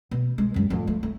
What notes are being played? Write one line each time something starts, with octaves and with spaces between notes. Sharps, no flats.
B2
G#3
F#2 G#3
F2 A2
F3 A3
A3